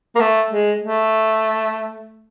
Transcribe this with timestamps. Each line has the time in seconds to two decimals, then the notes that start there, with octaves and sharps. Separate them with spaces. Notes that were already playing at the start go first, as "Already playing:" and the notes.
0.15 A#3
0.20 A3
0.50 G#3
0.82 A3